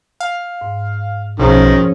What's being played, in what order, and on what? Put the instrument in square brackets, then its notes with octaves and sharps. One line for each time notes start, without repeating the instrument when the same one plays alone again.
[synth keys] F5
[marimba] G#2
[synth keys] B1 [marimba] F#2 G#4 C5 [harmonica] D#3 [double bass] F3 C#4